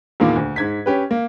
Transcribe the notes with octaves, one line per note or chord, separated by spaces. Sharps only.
E2 A#2 D#3 A#3
D2
G#2 G#6 B6
C#4 G4 B4
A#3